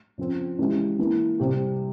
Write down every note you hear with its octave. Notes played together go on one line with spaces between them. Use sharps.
C#3 F3 C4
C#3 E3 G#3 E4 G4
E3 A#3 E4
C3 G3 C4 G4